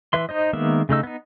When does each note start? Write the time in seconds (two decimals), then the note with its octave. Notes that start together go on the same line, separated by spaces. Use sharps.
0.13 E3 B4 E5 C6
0.29 D#4 C5 D#5
0.53 D#3 G#3 A#3 B3 E5
0.89 C#3 A3 D#4 E6
1.03 B3 D#4